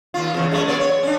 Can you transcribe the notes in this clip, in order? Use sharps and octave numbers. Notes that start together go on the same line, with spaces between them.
D#2 F4
E2 C#3
F#2 G#3 A3
A#3 C#5 D5
C#5
C#4 D4